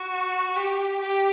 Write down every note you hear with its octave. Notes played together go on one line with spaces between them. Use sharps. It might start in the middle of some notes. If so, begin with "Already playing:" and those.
Already playing: F#4
G4
G4